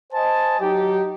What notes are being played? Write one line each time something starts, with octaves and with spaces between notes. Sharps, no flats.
C5 D#5 G#5 A5
F#3 D#4 G4